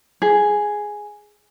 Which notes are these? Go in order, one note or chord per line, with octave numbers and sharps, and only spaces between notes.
G#4